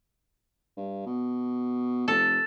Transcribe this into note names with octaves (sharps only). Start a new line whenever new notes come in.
G2
B2
F1 A4